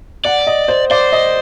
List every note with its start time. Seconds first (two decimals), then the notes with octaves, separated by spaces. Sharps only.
0.25 D5 F#5
0.47 D#5
0.68 C5
0.91 C5 D5
1.12 D#5